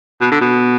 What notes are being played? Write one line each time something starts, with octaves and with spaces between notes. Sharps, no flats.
B2
D3
B2